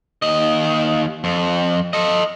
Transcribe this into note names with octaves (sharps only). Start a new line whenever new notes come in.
D#2 D#5
F2
A4 D#5